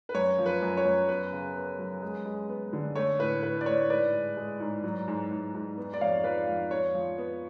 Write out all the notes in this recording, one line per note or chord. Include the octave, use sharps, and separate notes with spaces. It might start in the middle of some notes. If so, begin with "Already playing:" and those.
B4
F#2 C#5
F3
B4
F#2
C#5
F#2
B3 B4
C#3
B3
F#3
G#3
G#3
B3
D3
A3 C#5
A2 B4
A2 B4
D5
A2 C#5
G#2 B4 D5
G#3
G#3
G#2
F#3
G#2
G#2
G#2
B3
D5
F2 C#5 F5
F3 B4 D5
F2
B3 C#5
F3
B3